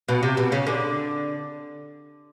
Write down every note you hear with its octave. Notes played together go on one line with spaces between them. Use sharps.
B2
C3
B2
C#3
D3